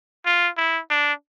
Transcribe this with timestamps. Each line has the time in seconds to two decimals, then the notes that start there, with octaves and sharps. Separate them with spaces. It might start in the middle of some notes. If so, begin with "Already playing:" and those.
0.26 F4
0.57 E4
0.90 D4